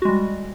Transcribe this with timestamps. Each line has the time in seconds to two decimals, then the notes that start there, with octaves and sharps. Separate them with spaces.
0.02 F#4
0.05 G#3
0.08 G3